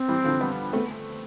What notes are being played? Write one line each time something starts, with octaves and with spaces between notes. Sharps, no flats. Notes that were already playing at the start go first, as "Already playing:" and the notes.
Already playing: C4
E3 G3
D3 F3
G3 B3
A3 B3 C4